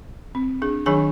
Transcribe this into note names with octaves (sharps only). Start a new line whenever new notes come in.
C4
D4 G#4
D#3 F#3 D4 G#4 G#5 B5